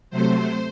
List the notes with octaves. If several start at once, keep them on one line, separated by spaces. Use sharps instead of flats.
C3 F#3 A3 C5